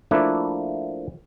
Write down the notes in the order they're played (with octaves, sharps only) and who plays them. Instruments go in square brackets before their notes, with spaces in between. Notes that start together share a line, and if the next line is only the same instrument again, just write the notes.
[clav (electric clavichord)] F3 A3 A#3 D4 E4